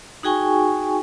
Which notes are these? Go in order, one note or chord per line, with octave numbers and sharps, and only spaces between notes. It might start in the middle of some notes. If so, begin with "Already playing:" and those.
D#4 F#4 G#4 G5 G#5 C#6